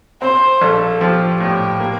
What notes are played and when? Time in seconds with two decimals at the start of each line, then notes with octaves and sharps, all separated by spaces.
0.22 C4 C5
0.62 A#1 A4
1.00 F3 G4
1.40 A2 G4
1.80 A#3